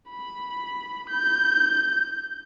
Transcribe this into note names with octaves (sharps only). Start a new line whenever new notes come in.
B5
G6